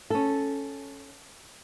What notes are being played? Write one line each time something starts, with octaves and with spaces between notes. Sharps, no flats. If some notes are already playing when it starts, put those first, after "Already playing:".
C#4 A4